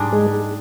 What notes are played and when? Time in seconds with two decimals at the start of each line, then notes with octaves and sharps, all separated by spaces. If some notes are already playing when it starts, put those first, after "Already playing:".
Already playing: G#2 G3 D4 G#4
0.13 G#3